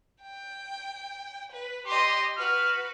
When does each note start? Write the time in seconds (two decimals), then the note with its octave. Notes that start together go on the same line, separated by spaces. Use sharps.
0.22 G5
1.52 B4
1.87 G4 D#5 C6
2.38 F#4 B4 F6